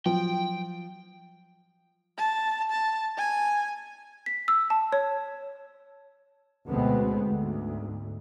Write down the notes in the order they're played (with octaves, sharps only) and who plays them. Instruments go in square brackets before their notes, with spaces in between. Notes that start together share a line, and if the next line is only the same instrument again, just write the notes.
[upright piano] F3 [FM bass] F#3 [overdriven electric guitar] G5
[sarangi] A5
A5
G#5
[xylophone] B6
E6
A5
C#5
[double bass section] D2 B2 G#3 B3 C4
D2 G#2